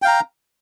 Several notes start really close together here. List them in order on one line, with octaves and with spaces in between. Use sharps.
G5 F5 A#5